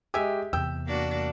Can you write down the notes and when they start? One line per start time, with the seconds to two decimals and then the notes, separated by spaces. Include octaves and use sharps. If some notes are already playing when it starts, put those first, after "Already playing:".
0.14 G#3 G4 E5 G#5
0.53 E2 C3 G5 E6
0.87 A#3 D4 F#4